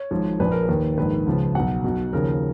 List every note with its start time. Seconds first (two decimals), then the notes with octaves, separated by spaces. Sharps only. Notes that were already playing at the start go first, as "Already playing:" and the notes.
Already playing: C#5
0.11 G#1 G#2 F3
0.39 A#1 A#2 F3 B4
0.52 A#4
0.63 B4
0.69 D#2 D#3
0.98 A#1 G#2 D#3 B4
1.26 C#2 C#3 F3
1.55 B1 B2 F#5
1.84 B1 B2
2.13 D#2 C#3 F3 A#4